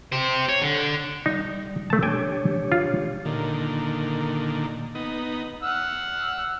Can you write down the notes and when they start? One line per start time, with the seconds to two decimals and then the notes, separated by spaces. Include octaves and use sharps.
0.12 G4 C5
0.49 C#5
0.62 D3
1.26 G3 D#4
1.90 A3 A5
2.03 D4 G4 C#5 G5 G#5
2.72 F4
3.25 A#2 D3 D#3
4.95 B3 D#4
5.63 F#5 E6 F6